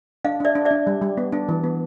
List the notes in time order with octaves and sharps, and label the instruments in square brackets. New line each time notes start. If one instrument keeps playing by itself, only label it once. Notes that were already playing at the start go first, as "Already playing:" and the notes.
[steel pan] D4 [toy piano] D#5 F5
[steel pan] D4 [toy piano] D5 E5
[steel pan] D4
[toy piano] D5 E5
[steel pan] D4
G3
G3
B3
D4
E3
B3